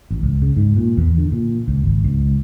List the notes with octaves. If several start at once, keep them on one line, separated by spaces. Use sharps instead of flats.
A1
C#2
C#3
G#2
A#2
E2
D3
A#2
C#2
G#1
C#2